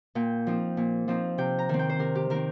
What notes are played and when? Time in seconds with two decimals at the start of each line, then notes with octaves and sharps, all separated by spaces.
0.15 A#2 G5
0.47 F3 C4 D#4
0.77 A#2
1.08 F3 C4 D#4
1.38 C3 G5
1.59 A#5
1.69 D#3 C4
1.79 G5
1.89 C5
1.99 C3 A#4
2.15 G4
2.30 D#3 C4 A#4